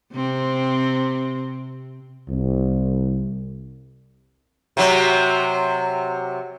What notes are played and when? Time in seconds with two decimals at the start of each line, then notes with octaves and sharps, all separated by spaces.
0.13 C3 C4
2.29 C2
4.77 C3 F#3